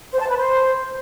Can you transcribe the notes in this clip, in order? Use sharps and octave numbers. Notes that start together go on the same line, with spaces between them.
C5
A5
B4
C5